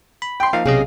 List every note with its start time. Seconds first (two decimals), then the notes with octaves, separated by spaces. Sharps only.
0.22 B5
0.40 G5 C6
0.53 F3 A#3 D#4 F5
0.66 B1 C3 C#4 G#4 D#5